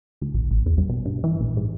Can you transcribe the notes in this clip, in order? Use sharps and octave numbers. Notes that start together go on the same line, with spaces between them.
D2
A#1
A1
E2
G2
B2
G2
E3
A#1
G#2